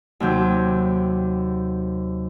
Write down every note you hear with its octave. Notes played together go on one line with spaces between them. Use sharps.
D#2 C3 F#3 G6